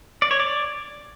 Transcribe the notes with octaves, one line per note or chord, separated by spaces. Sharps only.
D5
C#5
D5